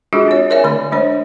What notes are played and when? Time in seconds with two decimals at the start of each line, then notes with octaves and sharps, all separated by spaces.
0.13 G#3 D4 F4 F#4 G#4 A4
0.28 C4 C#5
0.50 A#4 C#5 D5 E5 G#5
0.64 D3 A3 B5
0.92 G#3 A3 D4 C5 C#5